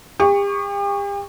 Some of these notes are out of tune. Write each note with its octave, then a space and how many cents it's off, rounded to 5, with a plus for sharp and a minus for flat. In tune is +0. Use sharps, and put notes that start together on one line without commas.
G4 +40 C#6 +5